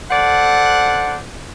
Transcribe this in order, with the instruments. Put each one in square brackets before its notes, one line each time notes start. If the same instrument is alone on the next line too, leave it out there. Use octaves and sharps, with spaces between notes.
[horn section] A4 C5 D5 F#5